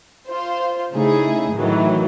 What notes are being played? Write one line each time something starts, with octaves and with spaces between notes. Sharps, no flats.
F4 C5
C#3 A3 D#4 E4 G#4
A2 D#3 E3 F#3